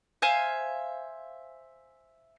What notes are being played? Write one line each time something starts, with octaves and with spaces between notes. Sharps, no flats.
C5 E5 F5 G#5